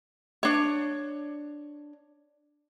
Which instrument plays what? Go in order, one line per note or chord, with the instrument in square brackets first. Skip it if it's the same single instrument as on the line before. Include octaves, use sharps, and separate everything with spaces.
[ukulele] D4 C#5